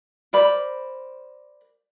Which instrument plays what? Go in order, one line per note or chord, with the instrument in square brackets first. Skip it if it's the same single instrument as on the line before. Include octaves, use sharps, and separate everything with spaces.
[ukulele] A#4 C5 D5 B5